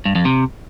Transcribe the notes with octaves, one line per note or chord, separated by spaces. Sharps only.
G2
F2
C3